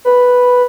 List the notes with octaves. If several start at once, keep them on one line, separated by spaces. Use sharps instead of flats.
B4